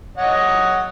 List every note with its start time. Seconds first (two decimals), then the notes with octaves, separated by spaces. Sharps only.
0.17 C#5 D#5 F#5